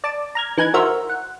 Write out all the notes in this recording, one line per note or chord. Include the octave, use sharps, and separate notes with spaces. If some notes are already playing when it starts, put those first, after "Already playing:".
D5 A5 D6
A#5 F6 G#6
E3 D#4 G#5 F#6 G#6
F#4 A#4 C5 E5 F6
F#5